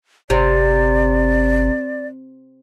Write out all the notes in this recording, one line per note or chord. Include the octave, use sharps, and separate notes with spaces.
G1 C3 D5